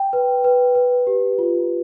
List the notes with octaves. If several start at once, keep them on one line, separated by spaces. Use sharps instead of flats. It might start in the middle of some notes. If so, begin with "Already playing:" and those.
Already playing: G5
B4
B4
B4
G4
F4